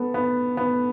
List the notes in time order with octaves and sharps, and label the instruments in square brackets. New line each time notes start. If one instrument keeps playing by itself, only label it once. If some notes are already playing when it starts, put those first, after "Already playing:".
Already playing: [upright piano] B3 A4
B3
B3